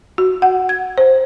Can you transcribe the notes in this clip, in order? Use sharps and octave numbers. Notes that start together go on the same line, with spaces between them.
F#4
F#5
G#6
C5